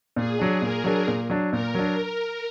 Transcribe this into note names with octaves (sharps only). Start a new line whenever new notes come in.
A#2 G#4
F#3 D4
A#2 A#4
F#3 D4
A#2
F#3 D4
A#2 A#4
F#3 D4